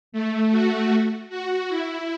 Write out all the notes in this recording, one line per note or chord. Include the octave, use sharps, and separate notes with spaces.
A3
F#4
F#4
E4